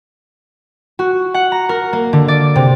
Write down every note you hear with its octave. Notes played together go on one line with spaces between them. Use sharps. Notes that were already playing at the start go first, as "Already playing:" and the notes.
F#4
F#5
A#5
A#4
A#3
D3
D5
C3